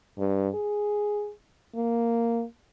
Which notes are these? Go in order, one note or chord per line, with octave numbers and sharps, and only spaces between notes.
G2
G#4
A#3